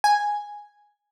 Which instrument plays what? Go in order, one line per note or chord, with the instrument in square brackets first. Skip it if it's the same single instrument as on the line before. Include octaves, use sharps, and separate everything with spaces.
[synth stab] G#5